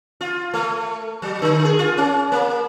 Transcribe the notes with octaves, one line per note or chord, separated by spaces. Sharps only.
F4
A3
F#3
D3
G#4
F4
C#4
A#3